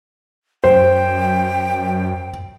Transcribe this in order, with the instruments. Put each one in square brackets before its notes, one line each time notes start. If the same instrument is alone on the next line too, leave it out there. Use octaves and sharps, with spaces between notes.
[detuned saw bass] F#2 [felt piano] C5 [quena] G5